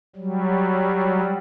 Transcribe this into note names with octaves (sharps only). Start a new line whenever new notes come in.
F#3 G3